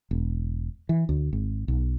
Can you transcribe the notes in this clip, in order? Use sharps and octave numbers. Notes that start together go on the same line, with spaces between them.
E1
E3
D2
G#1
B1